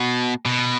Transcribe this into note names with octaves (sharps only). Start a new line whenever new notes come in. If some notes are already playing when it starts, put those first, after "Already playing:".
Already playing: B2
B2